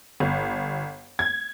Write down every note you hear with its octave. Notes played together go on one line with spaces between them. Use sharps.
G1
G#6